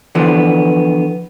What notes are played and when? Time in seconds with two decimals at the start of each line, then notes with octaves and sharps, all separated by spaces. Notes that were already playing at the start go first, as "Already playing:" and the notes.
0.15 D3 E3 F3 B3